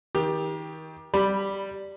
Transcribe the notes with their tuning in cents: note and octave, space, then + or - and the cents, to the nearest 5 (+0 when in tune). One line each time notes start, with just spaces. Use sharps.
D#3 +35 G4 +15
G3 +0 B5 +0